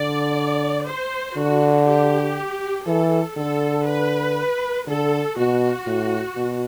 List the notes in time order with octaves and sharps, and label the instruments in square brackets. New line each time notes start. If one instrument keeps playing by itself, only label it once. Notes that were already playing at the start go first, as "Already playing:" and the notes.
Already playing: [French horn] D3 [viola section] D5
[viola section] C5
[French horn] D3 [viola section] F#4
[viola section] G4
[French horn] E3 [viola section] A4
[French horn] D3 [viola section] A4
[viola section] B4
[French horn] D3 [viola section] A4
[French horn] B2 [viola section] F#4
[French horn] A2
B2